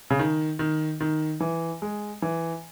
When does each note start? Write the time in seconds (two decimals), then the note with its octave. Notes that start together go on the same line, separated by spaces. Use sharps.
0.10 C#3
0.19 D#3
0.59 D#3
1.00 D#3
1.40 E3
1.82 G#3
2.22 E3